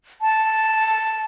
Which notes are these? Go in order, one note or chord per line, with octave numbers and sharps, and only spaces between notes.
A5